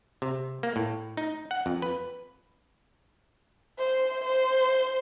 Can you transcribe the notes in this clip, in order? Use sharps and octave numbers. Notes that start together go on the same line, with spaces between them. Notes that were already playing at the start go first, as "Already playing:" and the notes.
C3
A#3
A2
D#4
F#5
F2
B4
C5
C5